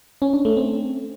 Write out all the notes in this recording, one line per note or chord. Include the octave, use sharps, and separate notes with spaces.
C#4
D4
A3
C4